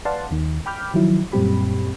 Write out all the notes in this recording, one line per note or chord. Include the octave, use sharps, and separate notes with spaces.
B4 D5 F5 F#5 A5 C6
D#2 D#3
G5 B5 D6 F6 G6
D#3 F3 F#3 E4
F#2 A#2 G3 C4 G4 B5